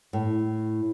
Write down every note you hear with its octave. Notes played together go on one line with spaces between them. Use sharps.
A2